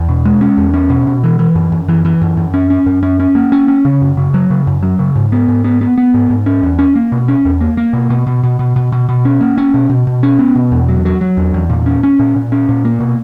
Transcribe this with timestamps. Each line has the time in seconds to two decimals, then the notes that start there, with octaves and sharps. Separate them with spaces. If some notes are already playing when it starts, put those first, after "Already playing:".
Already playing: E2
0.09 B2
0.25 G#3
0.41 C#4
0.58 E2
0.74 C#4
0.90 B2
1.07 B2
1.24 E3
1.39 E3
1.55 F#2
1.72 F#2
1.89 E3
2.05 E3
2.22 F#2
2.37 F#2
2.54 C#4
2.70 C#4
2.86 F#2
3.03 C#4
3.20 C#4
3.35 A#3
3.52 C#4
3.68 C#4
3.85 C#3
4.01 F#2
4.17 C#3
4.34 F#3
4.50 C#3
4.67 F#2
4.83 F#3
4.99 C#3
5.16 G#2
5.32 B3
5.48 G#2
5.64 B3
5.81 B3
5.98 B3
6.14 G#2
6.30 G#2
6.46 C#4
6.63 E2
6.79 C#4
6.96 A#3
7.12 B2
7.28 C#4
7.45 E2
7.61 A#3
7.77 A#3
7.93 B2
8.10 B2
8.27 B2
8.44 B2
8.59 B2
8.76 B2
8.92 B2
9.09 B2
9.25 C#4
9.41 A#3
9.58 C#4
9.74 B2
9.90 B2
10.07 B2
10.23 C#4
10.39 B3
10.55 B2
10.72 E2
10.89 F#3
11.05 F#3
11.21 F#3
11.37 E2
11.54 E2
11.70 A#2
11.86 C#4
12.03 C#4
12.19 A#2
12.36 A#2
12.52 C#4
12.69 A#2
12.85 A#3
13.00 B2